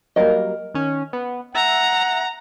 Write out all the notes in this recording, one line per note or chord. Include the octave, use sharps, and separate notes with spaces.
F#3 G3 A#3 A#4 D#5
D#3 C#4
B3
E5 F#5 A#5